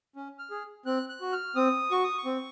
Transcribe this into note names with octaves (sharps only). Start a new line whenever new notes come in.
C#4
F6
G#4
C4 F#6
F#6
F#4
F6
C4 D#6
F#4 C#6
D#6
C#6
C4